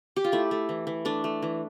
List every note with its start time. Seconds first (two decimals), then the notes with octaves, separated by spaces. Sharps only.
0.16 G4
0.24 F4
0.32 A3 E4
0.51 A3
0.69 E3
0.87 E3
1.05 A3 D4
1.24 A3
1.42 E3